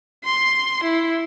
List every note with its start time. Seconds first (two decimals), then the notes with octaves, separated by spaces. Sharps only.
0.25 C6
0.84 E4